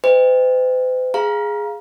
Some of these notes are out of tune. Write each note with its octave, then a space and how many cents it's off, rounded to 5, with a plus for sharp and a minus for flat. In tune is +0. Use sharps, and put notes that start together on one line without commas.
C5 -45 D#5 +0 G5 +35
G#4 +0 F5 +0 A#5 +25